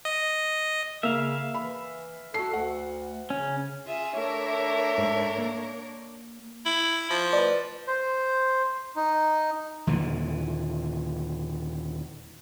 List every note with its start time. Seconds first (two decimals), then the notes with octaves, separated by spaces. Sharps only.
0.05 D#5
1.03 C#3 A#3 E5 F5
1.54 E3 B5
2.34 F#4 A4 C7
2.53 D2 F#5
3.30 C#3 C#4
3.86 F4 G#4 E5
4.17 A3 D4 A#4 C#5 E5
4.98 G#2
5.38 A#3
6.65 E4
7.10 F3
7.33 B4 D5
7.87 C5
8.96 D#4
9.87 D#2 A#2 D3 E3